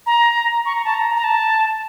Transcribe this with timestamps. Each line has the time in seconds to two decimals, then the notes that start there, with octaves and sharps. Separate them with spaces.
0.06 A#5
0.66 C#6
0.75 A#5
0.85 A5
0.94 A#5
1.15 A#5
1.24 A5